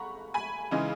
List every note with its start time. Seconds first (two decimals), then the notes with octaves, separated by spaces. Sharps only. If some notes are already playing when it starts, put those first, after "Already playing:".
Already playing: F#5 A#5 B5 C#6
0.34 G#5 B5
0.71 C#3 E3 G#3 D#4